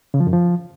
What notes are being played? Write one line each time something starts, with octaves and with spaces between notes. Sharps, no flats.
C#3
F3
F#2
F3